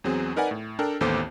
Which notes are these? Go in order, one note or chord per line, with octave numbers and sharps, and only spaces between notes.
E2 F#3 C4 G#4
D#4 A#4 B4 D5 F#5 G#5
A2
D4 A4 A#4 D5 G5
A1 D#2 B3 A4 C5 D6